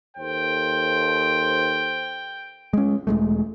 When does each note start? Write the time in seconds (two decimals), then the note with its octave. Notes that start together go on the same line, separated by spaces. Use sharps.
0.17 D#2 A4 C5 G5
2.73 G#3 C#4
3.07 E1 G#3 A3